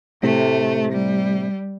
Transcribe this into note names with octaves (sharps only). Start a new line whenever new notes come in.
A2 C3 A3
G3